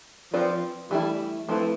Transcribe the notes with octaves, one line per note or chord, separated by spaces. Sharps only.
F3 C4 F4 B4 D5
E3 G3 A3 E4
F3 A3 C4 E4 B4